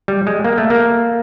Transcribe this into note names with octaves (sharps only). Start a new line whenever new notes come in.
G3
G#3
A#3
A3
A#3